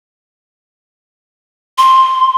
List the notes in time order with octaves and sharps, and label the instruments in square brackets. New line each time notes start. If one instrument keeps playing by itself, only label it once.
[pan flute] C6